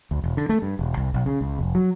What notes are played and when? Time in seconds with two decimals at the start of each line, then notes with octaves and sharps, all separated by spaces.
0.11 D2
0.24 E1
0.37 D3
0.49 A3
0.62 G2
0.79 E1
0.97 C2
1.14 B1
1.26 C#3
1.41 C#2
1.59 F1
1.75 F#3